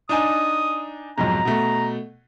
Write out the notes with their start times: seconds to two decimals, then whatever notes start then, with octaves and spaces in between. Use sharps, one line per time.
0.09 D4 D#4 G#5 D#6
1.18 B1 F2 G#2 A#5
1.45 B2 A3